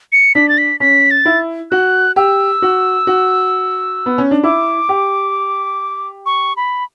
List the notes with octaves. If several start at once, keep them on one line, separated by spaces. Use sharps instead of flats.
C#7
D4 B6
A6
B6
C#4 B6
A6
E4
F#4 F#6
G4 E6
F#4
F#4
B3
C#4
D4
E4 D6
G4
C#6
B5